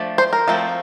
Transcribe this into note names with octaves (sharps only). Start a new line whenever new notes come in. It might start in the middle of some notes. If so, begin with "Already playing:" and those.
Already playing: F3 A3 D4
C5
A#4
F3 A3 C4